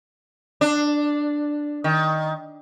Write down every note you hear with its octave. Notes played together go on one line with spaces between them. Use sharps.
D4
D#3